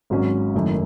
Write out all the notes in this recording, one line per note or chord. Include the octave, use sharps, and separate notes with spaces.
G#1 G#2 F#3 C#4 F#4
F#1 F#2 D#3 A3 E4